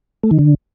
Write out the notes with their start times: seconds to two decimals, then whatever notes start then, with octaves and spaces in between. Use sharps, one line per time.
0.23 A3
0.31 D#3
0.39 D3